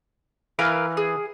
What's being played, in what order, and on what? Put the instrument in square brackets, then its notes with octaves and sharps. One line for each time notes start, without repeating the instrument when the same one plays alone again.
[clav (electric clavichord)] E3 [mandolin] A#4 B4 F5
[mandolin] G#4